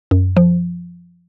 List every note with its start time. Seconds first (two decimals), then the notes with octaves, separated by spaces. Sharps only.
0.11 F#2
0.37 F3